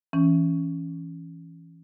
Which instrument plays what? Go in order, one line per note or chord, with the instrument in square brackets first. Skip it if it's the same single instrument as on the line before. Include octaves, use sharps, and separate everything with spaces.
[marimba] E3 C#4